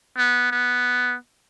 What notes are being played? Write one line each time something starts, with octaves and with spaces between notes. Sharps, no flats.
B3
B3